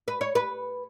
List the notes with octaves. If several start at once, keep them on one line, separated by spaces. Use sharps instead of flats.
B4
C#5
B4